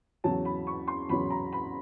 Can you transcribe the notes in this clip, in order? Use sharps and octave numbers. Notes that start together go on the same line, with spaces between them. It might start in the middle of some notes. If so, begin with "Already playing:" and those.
E2 C#3 F#3 A5
B5
C#6
C6
E2 C#3 F#3 B5
A#5
B5